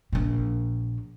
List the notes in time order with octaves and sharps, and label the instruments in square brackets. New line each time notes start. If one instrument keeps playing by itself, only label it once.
[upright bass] A#1 A#2